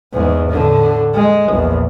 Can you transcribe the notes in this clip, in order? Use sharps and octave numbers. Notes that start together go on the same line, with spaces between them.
E2 G#2
A2 D3
G#3
A#1 E2